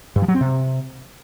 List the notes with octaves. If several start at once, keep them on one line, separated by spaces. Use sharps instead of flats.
G2
F3
F#3
C4
C3